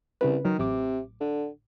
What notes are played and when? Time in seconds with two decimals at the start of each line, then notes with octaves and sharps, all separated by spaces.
0.21 C2 C#3 B4
0.45 D#3 F#3
0.59 A1 C3 D6
1.21 D3